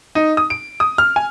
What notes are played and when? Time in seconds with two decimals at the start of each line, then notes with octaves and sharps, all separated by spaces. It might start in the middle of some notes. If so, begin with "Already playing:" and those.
0.15 D#4
0.37 D#6
0.50 D7
0.80 D#6
0.98 F6
1.16 G#5